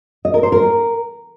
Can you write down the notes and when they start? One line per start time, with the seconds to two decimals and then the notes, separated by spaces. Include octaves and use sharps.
0.25 D#5
0.34 A#4
0.43 C5
0.52 A#4